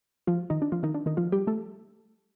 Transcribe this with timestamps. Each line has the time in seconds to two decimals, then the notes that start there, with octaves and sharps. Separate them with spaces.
0.27 F3 F4
0.50 D#3 D#4
0.62 D4
0.72 F3 F4
0.83 D#3 D#4
0.95 D4
1.06 D#3 D#4
1.17 F3 F4
1.32 G3 G4
1.47 A3 A4